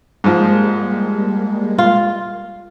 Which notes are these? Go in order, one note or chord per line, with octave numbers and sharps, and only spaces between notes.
G#2 F3 G3 G#3 A#3
F4